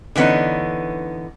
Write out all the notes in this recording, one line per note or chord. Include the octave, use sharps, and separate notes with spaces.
D3 E3 B3 C#4 D#4